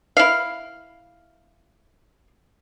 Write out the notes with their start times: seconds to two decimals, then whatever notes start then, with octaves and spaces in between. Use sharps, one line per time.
0.17 E4 F5